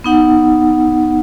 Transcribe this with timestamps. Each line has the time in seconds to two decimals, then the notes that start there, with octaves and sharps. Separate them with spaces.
0.04 B3 D#4 F#5